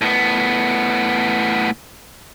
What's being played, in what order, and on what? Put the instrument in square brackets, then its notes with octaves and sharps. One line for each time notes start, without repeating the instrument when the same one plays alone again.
[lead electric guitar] A2 B3